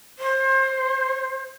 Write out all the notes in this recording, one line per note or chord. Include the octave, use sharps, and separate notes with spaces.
C5